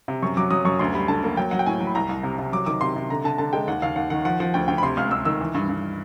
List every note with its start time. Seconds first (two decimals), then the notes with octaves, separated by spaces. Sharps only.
0.08 C3
0.22 F#2 C#6
0.37 F#3 D6
0.51 F#3 D#6
0.65 F#2 C#6
0.79 D2 C6
0.94 G3 B5
1.08 D3 A5
1.23 A#3
1.37 F#3 G5
1.51 F#3 F#5
1.59 G5
1.66 A2 G#5
1.80 F#3
1.87 B5
1.95 C2 A#5
2.09 C2
2.23 C3
2.39 C3
2.52 F#3 D6
2.66 D#3 D6
2.81 C3 C6
2.96 C3
3.10 D3 A#5
3.24 D3 A5
3.38 D3 A5
3.53 G#3 G5
3.67 D#2 F#5
3.82 D#2 F5
3.96 D#2 F#5
4.10 D#3 F#5
4.25 F3 F#5
4.40 F3 F#5
4.54 D2 G5
4.68 D2 G5
4.78 B5
4.83 C3 C6
4.97 C#2 F6
5.11 C#2 E6
5.25 D#3 E6
5.41 E3
5.54 G2
5.69 G2